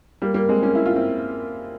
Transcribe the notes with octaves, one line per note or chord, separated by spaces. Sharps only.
G3 A#3
G3 A#3
G#3 C4
A#3 C#4
E4
F4
C4 E4